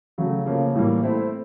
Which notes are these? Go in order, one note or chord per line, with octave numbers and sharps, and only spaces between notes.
C#3 F#3 A3
C#3 F3 A#3
A2 E3 G3 A#3
A3 C4 E4